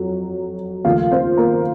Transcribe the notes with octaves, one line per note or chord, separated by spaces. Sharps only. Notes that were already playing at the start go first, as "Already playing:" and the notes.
Already playing: F2 F#3
D#2 C#3 F3 A3 F4 F5
C4 C5
A#3 A#4